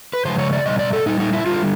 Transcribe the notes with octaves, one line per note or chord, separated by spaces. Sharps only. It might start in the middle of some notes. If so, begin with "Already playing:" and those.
B4
C#3 F3 G#3 C5
C#5
D5
B2 G3 D#5
D5
A4
A#2 G3 D#4
D#4
E4
D3 G3 F4